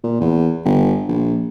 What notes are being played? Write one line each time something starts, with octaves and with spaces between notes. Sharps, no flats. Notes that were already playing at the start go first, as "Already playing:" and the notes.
A#2
E2
G1
A#1